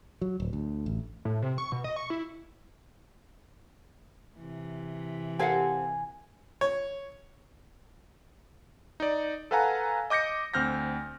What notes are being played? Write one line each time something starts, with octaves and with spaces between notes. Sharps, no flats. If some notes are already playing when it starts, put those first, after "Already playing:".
F#3
D1
D2
A1
A2
C3
C#6
B2
D#5
C#6
E4
C3 E3
C4 G4 A4 A#4 F5 F#5 G#5
C#5
D#4 D5
A4 B4 F5 F#5 G#5 A#5
D#5 D6 G6 A#6 C#7
D2 C4 F6 G6 A#6